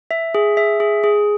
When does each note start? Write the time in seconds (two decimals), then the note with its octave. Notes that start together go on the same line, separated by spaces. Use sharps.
0.11 E5
0.35 G#4
0.57 E5
0.80 G#4
1.04 G#4